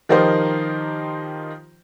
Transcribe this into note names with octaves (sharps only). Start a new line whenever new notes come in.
D#3 F3 D#4 G4 A#4 C5